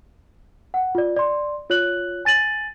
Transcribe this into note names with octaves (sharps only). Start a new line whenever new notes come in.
F#5
F4 D5
D5 C6
F4 C#5 F#6 F#7
G#5 A6 D#7 F#7